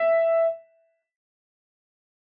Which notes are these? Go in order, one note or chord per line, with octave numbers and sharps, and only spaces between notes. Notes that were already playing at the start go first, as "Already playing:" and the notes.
Already playing: E5